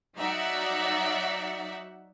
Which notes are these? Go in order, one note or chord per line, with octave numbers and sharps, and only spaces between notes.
F#3 D#4 F#4 D5 E5 F#5